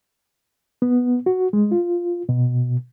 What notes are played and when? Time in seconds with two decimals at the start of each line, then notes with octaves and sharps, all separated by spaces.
0.82 B3
1.26 F#4
1.53 G#3
1.71 F4
2.29 B2